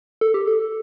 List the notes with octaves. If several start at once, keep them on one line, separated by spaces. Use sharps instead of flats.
A4
G4
A4